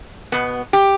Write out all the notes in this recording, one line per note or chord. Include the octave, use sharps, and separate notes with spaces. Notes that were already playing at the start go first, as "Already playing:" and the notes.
B2 B3
G4